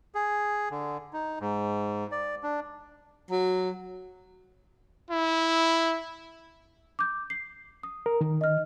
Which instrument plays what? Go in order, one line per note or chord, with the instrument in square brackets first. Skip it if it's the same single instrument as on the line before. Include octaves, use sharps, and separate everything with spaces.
[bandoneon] G#4
D3
D#4
G#2
D5
D4
[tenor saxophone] F#3
[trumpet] E4
[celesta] D6 G6
C7
D#6
[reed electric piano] A#4
D#3
[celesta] D#5 F6